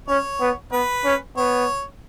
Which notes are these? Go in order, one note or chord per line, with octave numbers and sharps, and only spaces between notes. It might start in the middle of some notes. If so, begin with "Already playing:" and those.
C#4 C#5
B3
B3 B4
C#4
B3 C#5